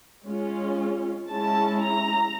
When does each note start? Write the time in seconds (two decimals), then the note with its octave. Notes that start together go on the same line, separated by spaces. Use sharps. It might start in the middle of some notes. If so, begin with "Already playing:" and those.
0.24 G#3 C#4 F4
1.29 G#3 C#4 E4 A5
1.80 A#5